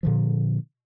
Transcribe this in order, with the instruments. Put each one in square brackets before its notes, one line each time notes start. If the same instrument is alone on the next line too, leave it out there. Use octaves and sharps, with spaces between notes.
[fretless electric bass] A#2 D3 F3